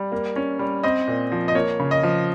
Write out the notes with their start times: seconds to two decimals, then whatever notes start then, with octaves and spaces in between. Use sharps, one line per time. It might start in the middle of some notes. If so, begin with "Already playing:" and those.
Already playing: G3
0.12 A#3
0.36 C#4
0.59 G3
0.84 C4 D#5
1.07 A#2
1.32 F3
1.48 D#5
1.55 A#3 C#5
1.80 C#3
1.91 D#5
2.03 F3